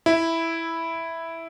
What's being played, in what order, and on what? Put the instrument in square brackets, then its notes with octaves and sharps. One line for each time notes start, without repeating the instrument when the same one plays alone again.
[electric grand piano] E4